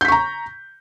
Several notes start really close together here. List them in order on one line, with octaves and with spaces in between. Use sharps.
G6 B6 C#6 A#5